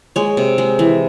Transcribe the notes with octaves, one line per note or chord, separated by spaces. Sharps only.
G#3 C#5
C3
G#3
E3